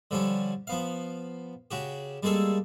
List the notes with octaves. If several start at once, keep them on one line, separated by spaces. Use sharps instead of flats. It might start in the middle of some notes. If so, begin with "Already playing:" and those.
D3 F3 G3 C#4
F3 B3 F5
C#3 F#4 G4
G3 G#3 A#3 G#4 A4